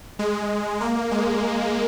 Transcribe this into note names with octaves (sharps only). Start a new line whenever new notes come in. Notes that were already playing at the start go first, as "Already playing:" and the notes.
G#3
A#3
G#3